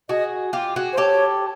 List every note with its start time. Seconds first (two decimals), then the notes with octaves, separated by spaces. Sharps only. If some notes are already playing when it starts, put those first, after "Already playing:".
0.09 F#4 G#4 D#5
0.53 F4 G4
0.76 F#4 G#4
0.93 C5
0.97 G4 A4 C#5